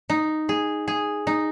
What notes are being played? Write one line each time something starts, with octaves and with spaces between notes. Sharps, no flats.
D#4
G#4
G#4
D#4